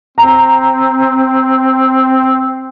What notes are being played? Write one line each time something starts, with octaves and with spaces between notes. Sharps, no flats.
C4 A#5